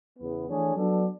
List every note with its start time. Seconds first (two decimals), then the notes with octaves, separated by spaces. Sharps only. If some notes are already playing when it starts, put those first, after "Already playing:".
0.18 E2 C#3 E3 B3
0.47 E3 A3 D4 G#4 C#5
0.76 F#3 B3 D4 A4 D5